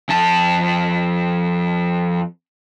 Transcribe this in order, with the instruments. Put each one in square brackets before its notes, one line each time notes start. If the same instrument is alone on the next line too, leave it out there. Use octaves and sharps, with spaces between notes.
[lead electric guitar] F2 A5